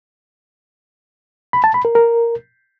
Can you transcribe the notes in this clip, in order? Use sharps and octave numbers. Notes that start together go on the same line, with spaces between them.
B5
A5
B5
A#4
A#4